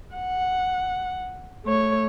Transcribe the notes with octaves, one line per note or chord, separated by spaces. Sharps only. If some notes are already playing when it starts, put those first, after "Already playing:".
F#5
A3 C#5